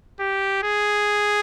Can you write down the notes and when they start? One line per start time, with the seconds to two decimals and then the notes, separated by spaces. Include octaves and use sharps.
0.20 G4
0.63 G#4